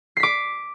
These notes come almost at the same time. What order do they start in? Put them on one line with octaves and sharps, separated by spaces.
C7 B6 D6